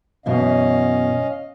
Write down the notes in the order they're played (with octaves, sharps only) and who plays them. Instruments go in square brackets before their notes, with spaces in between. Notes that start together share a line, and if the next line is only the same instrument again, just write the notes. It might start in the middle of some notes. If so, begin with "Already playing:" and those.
[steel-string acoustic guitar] F#2 B2 E3 [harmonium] C#4 D#5 F5